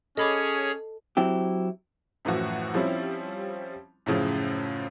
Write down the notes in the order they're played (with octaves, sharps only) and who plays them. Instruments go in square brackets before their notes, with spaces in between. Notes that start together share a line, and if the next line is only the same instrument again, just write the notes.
[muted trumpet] C#4 [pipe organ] G#4 C#5 [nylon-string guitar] A4 [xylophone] D#5 B5 D6
[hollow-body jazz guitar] F#3 C4 E4 G4
[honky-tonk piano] F#2 A2 E3 F3 F#4
F3 G3 C4 C#4 E4
F#2 A2 C#3 F3 C#4